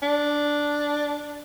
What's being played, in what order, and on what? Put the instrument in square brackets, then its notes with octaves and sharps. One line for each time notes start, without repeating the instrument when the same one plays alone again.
[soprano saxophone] D4